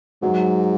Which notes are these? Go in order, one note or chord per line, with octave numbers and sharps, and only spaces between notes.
G#2 F#3